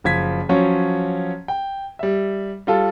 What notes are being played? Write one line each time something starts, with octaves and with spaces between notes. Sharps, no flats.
F#1 F3 G#6 B6
F3 F#3 C#4 C#5
G5
G3 E5
G3 F4 A4